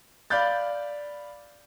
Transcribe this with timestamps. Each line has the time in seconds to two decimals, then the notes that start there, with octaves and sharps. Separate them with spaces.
0.30 D5 F5 B5 G6 A6